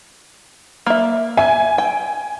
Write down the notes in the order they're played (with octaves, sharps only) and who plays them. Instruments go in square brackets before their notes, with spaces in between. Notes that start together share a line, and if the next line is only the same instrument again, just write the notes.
[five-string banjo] A#3 E5
[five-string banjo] E5 [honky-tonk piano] G#5
[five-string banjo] G5